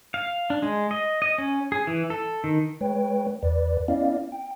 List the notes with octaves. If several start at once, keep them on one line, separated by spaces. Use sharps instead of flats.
F5
D4
G#3
D#5
D#5
C#4
G#4
E3
A4
D#3
G#3 B4 C#5 G5
E2 B4 D5
B3 C#4 E4 D5 D#5 F5
G5